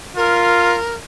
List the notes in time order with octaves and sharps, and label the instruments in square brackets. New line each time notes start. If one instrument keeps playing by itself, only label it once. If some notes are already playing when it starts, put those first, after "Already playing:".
[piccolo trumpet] F4 [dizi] A#4